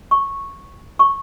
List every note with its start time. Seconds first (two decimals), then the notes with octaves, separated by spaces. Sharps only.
0.11 C#6
0.99 C#6